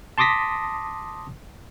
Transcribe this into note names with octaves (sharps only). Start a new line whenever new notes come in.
A5 C6 D6 D#6 A#6 B6